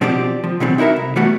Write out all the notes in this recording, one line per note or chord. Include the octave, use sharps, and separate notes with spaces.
B2 F3 C4 D4 G4 D5
F3
B2 D3 E3 F#3 G3 C4
D#4 E4 F#4 A#4 E5
C2
E3 G3 A3 B3 F#4